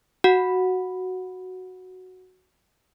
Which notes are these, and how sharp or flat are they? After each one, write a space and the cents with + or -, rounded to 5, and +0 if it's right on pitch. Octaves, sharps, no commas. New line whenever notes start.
F#4 +0 F#5 -15 B5 +0